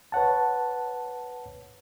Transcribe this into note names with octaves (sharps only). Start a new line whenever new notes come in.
B4 C#5 F#5 A5